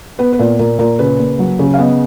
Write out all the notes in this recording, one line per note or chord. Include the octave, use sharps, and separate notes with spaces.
B3 B4
B4
A#2 A#4
A#2 A#4
A#2 A#4
C#3 B4
A#3
F#3
C#3
F5
B3 D#5